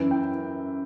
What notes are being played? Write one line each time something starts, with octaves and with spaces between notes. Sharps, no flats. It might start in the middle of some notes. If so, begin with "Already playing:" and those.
Already playing: F#2 E3
G5